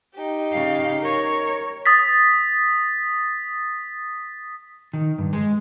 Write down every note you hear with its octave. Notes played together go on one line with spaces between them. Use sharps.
D#4 G4
C#3 F5
A#4 C#5
D#6 A6 B6
D#3
G2
G#3